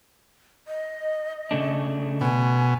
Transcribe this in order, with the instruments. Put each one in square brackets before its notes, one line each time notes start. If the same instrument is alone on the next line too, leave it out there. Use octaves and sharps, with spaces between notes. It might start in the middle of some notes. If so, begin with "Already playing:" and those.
[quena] D#5
[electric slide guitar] C#3 A3 D4
[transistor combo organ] B2 [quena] G#5